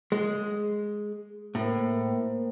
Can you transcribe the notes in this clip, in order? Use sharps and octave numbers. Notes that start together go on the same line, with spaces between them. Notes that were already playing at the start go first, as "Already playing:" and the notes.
G#3
A2 A#3 A#4 C5